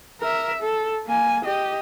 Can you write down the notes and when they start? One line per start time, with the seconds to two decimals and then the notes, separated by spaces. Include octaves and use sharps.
0.21 A#4 E5
0.63 A4
1.07 A#3 G#5
1.45 G4 D#5